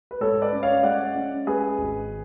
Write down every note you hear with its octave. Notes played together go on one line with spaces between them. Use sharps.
B4
G#2 A4 C#5
B4 D5
C#4
C#5 F5
G#3 D5 F#5
C#4
G#3 G#4 B4
G#1